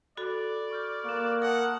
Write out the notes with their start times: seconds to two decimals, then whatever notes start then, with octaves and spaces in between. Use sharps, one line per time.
0.17 F#4 A4 D5 B5
0.71 C#6 F6 G6
1.05 A#3 C#6 F#6 E7
1.42 A#4 F#5 A5 D#6